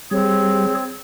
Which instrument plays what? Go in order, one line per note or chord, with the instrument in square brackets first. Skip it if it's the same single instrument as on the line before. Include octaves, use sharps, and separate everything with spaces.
[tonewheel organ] G3 [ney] C4 [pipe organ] G#4 C#5